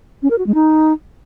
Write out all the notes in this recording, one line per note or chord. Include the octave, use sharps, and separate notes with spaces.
C#4
A#4
F#4
G#3
D#4